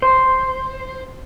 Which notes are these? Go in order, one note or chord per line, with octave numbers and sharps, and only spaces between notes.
C5